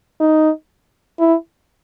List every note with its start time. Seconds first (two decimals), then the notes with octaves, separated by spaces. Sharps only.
0.20 D#4
1.19 E4